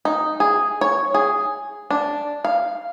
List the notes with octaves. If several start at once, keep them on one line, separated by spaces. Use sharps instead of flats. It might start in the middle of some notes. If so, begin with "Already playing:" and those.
D#4
G#4
C#5
G#4
D4
F5